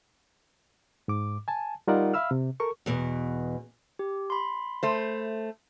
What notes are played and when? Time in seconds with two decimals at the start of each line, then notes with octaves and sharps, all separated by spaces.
1.08 G#2 D6
1.48 G#5 A5
1.88 G3 D#4 F4 A#4 D5 F#5
2.14 E5 F5 B5 E6 F6
2.31 C3
2.60 A4 A#4 C#6
2.86 E2 B2
3.99 G4
4.30 B5 C6
4.83 A3 C5